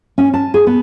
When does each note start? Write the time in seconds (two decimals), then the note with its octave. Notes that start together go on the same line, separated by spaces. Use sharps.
0.18 C#4
0.34 A5
0.54 G#4
0.67 B3